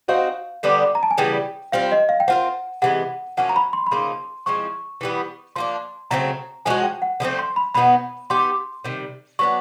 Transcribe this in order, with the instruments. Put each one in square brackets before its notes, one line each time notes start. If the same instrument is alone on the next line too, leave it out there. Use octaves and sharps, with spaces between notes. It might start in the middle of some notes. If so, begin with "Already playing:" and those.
[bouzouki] C4 D#4 F#4 [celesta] F5
[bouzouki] D3 G3 B3 D4
[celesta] A#5
A5
G#5
[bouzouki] C#3 E3 G3 B3 [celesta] G5
[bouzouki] G3 C4 F4 [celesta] F5
[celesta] D#5
F5
G5
[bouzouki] C4 F4 A#4 [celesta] F#5
[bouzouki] C3 E3 G#3 B3 [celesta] F#5
[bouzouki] F3 A#3 C#4 F#4 [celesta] F#5
[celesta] A#5
B5
C6
B5
[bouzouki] C#3 F3 A#3 D#4 [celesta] C6
[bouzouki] F3 G#3 C4 E4 [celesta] C#6
[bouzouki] E3 G3 B3
[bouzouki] F3 A#3 D4 [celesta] C6
[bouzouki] C#3 F#3 A3 C4 [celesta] A#5
[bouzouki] F3 G#3 C#4 F#4 [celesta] G#5
[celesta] G5
F#5
[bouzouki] D3 F3 A3 C4
[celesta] C6
B5
[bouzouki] B2 F#3 B3 D#4 [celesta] B5
[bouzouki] B3 D#4 G4 [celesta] C6
[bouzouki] C3 D#3 G3
[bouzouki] F#3 B3 D4 [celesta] C#6